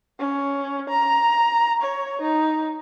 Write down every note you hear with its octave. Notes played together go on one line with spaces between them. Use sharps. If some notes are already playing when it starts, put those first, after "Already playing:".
C#4
A#5
C#5
D#4